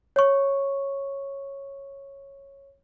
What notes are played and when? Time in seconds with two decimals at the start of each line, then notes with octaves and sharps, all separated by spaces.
0.16 C#5 C#6